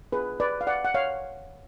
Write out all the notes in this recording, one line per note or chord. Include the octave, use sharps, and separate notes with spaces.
B3 D4 F4 G#4 B4
B4 D5
F5
D5 F#5
F#5
C#5 F5